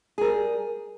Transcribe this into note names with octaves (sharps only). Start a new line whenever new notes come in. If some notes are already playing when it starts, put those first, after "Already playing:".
G3 G#4 A#4